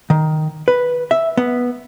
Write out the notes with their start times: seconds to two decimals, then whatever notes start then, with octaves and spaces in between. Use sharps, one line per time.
0.10 D#3
0.68 B4
1.11 E5
1.37 B3